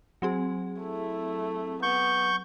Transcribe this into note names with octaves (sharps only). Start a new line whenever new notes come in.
F#3 C4 G#4
A3 E4
B3 C#6 G6